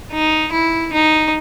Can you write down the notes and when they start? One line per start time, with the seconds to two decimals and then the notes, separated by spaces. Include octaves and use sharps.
0.12 D#4
0.53 E4
0.93 D#4